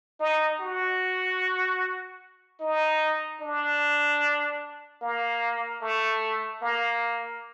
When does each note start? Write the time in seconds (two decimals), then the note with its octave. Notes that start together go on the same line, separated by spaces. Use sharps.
0.20 D#4
0.60 F#4
2.61 D#4
3.41 D4
5.02 A#3
5.82 A3
6.62 A#3